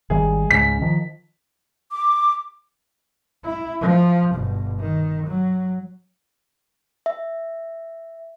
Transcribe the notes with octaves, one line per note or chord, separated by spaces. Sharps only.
G#1 D#3 G3 G#4
C#2 G#2 C#3 B6
D#3 F3
D6
E4
F3
G1 B2
D#3
F#3
E5